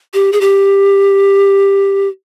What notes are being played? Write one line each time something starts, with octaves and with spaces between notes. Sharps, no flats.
G4
G#4
G4